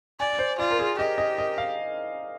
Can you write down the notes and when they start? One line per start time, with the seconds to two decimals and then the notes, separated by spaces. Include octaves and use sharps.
0.20 D5 G#5
0.39 C5
0.59 F4 D5
0.71 A#4
0.79 G#4
0.98 G4 D#5
1.18 D#5
1.38 D#5
1.58 F5